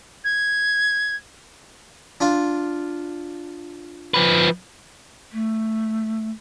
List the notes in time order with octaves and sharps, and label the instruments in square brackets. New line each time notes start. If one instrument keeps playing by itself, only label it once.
[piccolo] G#6
[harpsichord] D4 F4
[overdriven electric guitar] F3 B4
[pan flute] A3